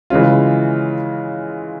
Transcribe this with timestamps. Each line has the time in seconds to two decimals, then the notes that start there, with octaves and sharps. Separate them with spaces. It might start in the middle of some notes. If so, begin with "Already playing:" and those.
0.10 C#3 E3 G#3 C#4 F4